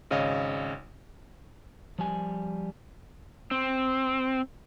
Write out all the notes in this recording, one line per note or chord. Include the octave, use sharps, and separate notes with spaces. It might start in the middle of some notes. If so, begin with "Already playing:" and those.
G#1 C#3 C#5 D#5 F5
F3 G3 G#5
C4